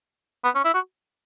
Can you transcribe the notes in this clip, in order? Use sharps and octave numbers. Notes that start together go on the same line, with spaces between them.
B3
C#4
E4
F#4